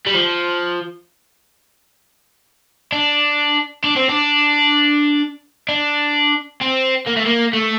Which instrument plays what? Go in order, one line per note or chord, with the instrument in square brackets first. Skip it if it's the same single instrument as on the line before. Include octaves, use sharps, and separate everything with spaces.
[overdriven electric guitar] G3
F3
D4
D4
C4
D4
D4
C4
A#3
A3
A#3
A3